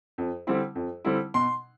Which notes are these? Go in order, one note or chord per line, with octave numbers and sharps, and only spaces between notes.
F2
D3 G3 C4 E4
F2
D3 G3 C4 E4
B2 C6